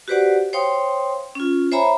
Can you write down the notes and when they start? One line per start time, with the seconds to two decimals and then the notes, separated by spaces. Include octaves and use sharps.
0.08 F#4 G4 B4 C5 D5 F#5
0.53 C5 C#5 F5 G5 C6 D#6
1.35 C#4 F4
1.72 C5 C#5 E5 G#5 A#5 B5